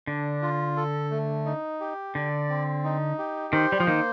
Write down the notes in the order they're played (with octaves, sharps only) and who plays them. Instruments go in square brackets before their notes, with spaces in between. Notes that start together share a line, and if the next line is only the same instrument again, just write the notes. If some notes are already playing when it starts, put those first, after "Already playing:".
[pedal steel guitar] D3 [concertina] D4
[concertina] F4
A4
A3
D#4
G4
[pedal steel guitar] D3 [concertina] D5
[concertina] C4
D#4
G4
[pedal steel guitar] D#3 [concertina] C5
[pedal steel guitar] G3
F3
[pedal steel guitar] D#3 [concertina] A#3